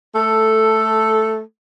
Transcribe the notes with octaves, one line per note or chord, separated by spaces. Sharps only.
A3 A4